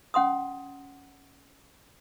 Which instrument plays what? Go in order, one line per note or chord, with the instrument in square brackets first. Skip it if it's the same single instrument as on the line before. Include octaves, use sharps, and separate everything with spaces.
[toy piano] C#4 F#5 C6 D#6